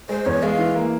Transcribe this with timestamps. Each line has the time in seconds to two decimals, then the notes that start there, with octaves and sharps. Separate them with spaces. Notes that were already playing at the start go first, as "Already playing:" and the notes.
0.09 G#3 C5
0.25 E2 C#5
0.43 G#3 F5
0.59 E3
0.75 A#3